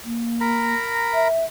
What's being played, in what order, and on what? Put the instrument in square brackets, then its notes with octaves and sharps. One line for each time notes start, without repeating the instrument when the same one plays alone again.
[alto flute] A#3
[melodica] A#4 A#5 B5
[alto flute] E5